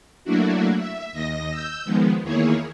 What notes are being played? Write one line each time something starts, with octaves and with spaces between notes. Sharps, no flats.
F#3 A3 A#3 D4 E4 F#4
E5
D#2 D#5 A#6
E6 G6
D#3 F3 G#3 B3
E2 D#3 A#3 E4 G#4 C#5